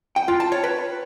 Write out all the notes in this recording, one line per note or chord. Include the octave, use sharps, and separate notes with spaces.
G5
F4
A5
C#5
B4